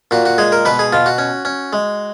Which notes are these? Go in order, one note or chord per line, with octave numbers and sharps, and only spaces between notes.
A#2 F#4
F#4
G#3 G#4
A#4
B2 B4
G#4
B2 F4
F#4
C#4
C#4
G#3